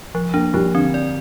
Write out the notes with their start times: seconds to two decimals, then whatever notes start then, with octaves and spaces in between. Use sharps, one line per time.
0.15 F3
0.34 A#3 D4
0.54 F3 G3
0.75 D3 C4
0.94 D5